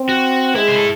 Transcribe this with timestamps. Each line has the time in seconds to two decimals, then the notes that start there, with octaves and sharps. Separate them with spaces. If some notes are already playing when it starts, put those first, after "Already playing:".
Already playing: C4
0.09 F#4
0.55 G#3 E4
0.68 C5
0.77 A4